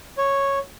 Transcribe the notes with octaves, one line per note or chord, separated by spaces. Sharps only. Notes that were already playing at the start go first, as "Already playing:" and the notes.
C#5